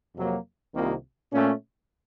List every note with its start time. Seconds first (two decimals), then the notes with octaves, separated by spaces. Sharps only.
0.15 F2 C3 F#3 A#3
0.74 C2 C3 D#3 A#3 F4
1.31 A#2 A3 C#4